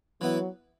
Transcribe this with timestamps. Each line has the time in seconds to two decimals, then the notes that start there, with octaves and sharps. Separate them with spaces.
0.21 E3 F#3 B3 E4